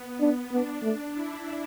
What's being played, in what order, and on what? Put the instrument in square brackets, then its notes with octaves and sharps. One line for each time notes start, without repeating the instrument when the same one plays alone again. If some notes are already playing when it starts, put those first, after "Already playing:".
Already playing: [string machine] B3
[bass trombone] D4
[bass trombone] B3 [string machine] D4
[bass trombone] A3
[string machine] E4